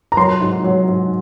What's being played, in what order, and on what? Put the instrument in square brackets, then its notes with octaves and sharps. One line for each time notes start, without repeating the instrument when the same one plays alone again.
[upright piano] A#5
F#3 C6
G#2
F#3
G#2